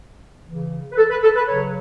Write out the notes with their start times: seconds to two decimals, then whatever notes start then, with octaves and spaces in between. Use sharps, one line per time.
0.46 C#3 E3
0.92 B4
0.97 A4
1.10 B4
1.23 A4
1.36 B4
1.48 C#3 F#3 C#5